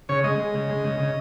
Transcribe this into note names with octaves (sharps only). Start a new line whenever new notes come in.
C#3 C#5
G#3 D#5
G#3
C#3
G#3
C#3
C#3